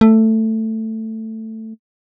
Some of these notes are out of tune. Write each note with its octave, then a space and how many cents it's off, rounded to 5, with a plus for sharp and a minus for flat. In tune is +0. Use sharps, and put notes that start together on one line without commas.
A3 +10